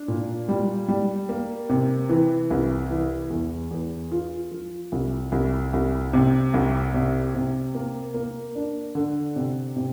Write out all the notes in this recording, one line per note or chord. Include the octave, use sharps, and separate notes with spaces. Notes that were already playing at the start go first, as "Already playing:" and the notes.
Already playing: D4
A#2
G3
G3
A#3
C3
E3
C2
E3
E2
E2
F4
F3
C2
C2
C2
C3
C2
C3
C3
A#3
A#3
D4
D3
C3
C3